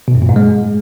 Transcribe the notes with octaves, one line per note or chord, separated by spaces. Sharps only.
B2
F#2
A#2
G#2
G#3